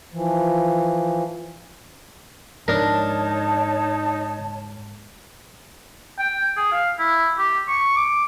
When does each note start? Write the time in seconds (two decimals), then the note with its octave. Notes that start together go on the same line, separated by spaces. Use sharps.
0.12 E3 F3
2.68 G#2 F3 G#3 D4 D#4 A#4 C#5 A5
6.19 G5
6.57 G#4
6.72 F5
6.99 E4
7.38 G4
7.68 C#6
7.96 D6